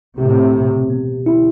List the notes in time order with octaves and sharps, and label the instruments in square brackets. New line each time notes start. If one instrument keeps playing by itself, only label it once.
[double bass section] A2 C3 [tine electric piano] G4
[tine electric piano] B2
B3
E4